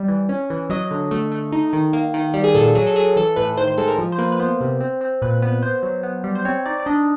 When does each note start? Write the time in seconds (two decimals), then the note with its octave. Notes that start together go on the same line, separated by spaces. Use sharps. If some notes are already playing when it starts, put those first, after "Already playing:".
Already playing: G3
0.08 E3
0.29 C#4
0.50 E3
0.70 F#3 D#5
0.91 D3
1.11 A3
1.32 A3
1.52 D#4
1.73 D#3
1.93 A#3
2.14 D#3
2.34 G3
2.44 G#4
2.55 A#2 A4
2.75 F#3 G#4
2.87 A4
2.96 F#3 G#4
3.16 E3 A4
3.36 A2 B4
3.57 D#3 C5
3.68 C5
3.78 G#3 A4
3.88 A#4
3.98 F3
4.12 C5
4.18 A#3 B4
4.32 B4
4.40 B3 C5
4.61 C3
4.81 C4
5.01 C4
5.22 A#2 B4
5.42 B3 B4
5.63 B3 C5
5.83 F#3
6.03 B3
6.24 G3
6.35 C5
6.45 C4 C#5
6.66 D#4 D5
6.80 D5
6.86 D4 D#5